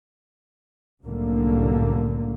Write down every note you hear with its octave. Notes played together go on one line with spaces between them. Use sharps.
C2 F#2 A2 D3 A#3